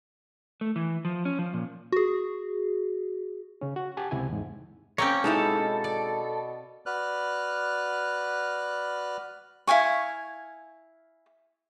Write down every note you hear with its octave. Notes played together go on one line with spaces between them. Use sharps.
A3
E3
F3
C#4
F3
A#2
F#4 G#4
C#3 C#4
F#4
G4 F#5 G#5 A5
C#2 C3 E4 G#5
E2 G#2
A#3 C4 C#4 C#5 G5
B2 G#3 D#4 E4 A4
D5
F#4 B4 D5 F6 F#6
E4 F5 G#5 C#6